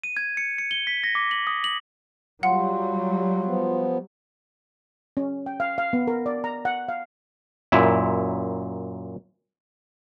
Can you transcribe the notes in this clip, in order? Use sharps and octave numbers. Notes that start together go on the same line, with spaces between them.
D#7
G#6
C#7
C#7
G7
B6
A#6
D6
F#7
D#6
F#7
F#3 G3 F4 F5 F#5 C6
F3 B3
C#4
G5
F5
F5
B3
A#4
D5
A#5
F#5
F5
F#2 A#2 E4